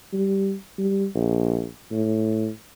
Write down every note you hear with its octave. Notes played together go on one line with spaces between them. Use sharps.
G3
G3
A#1
A2